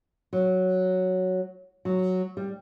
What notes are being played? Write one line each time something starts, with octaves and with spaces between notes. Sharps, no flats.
F#3
F#3
G3